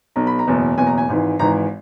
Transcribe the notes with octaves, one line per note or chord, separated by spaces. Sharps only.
B1 B2 A#5
B5
A#5
F#1 E2 B2
F#1 E2 B2 G#5
A#5
G#5
G#1 G#2 E3
G#1 G#2 E3 A#5